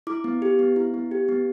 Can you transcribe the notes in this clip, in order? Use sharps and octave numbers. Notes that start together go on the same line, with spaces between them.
E4 D6
B3
G4
B3
E4
B3
G4
B3